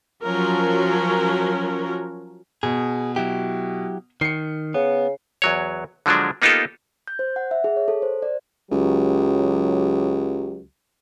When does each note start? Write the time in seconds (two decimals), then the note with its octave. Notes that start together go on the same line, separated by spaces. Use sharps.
0.23 F3 F#3 C#4 A#4
2.63 B2 G#4
3.16 F#3 E4 G4
4.21 D#3 C7 C#7
4.74 C#3 B3
5.42 E2 F#3 C#5
6.06 D3 F3 F#3 G#3 D4
6.42 A#3 B3 D#4 F4 G4 A4
7.08 G6
7.19 C5
7.36 F#5
7.51 E5
7.64 G#4
7.76 C#5
7.88 A4
8.02 C5
8.22 D5
8.72 C#2 F#3 G4